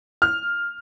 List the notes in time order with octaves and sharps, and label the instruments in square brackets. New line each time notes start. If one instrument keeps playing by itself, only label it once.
[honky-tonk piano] F6